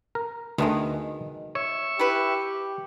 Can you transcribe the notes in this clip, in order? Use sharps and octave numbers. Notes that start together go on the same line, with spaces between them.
A#4
D2 B2 D3 D#3 G#3 A3
C#5 E5 C#6
E4 G4 B4